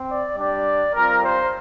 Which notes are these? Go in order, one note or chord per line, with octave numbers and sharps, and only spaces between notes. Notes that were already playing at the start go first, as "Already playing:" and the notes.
Already playing: C4
D5
G3 D4 G4 D5
G3 C4 F4 A#4
C5